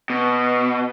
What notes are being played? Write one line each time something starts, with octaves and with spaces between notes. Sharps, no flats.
B2